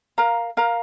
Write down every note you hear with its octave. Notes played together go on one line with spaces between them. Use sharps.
A#4 F5 A#5
A#4 F5 A#5